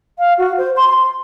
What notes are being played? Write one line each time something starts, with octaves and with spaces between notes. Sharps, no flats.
F5
F#4
C5
C6
C6